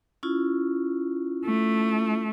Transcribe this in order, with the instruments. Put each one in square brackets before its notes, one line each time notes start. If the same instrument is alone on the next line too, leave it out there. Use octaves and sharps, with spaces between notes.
[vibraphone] C#4 E4 F4
[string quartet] A3